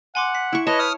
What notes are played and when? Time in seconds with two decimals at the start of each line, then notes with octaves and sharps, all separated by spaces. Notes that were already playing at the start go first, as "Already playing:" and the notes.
0.15 F#5 G#5 C6 D6
0.35 B6
0.53 E4 C#6
0.67 B4 C#5 D#5 A5
0.79 D#6 F6